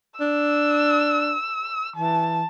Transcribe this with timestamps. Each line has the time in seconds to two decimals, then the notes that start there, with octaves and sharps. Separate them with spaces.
0.20 D4 E6
1.96 E3 A5